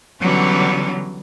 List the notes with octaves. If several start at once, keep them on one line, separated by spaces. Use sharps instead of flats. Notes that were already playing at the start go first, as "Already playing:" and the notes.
D3 E3 F#3 G3 B3 C#4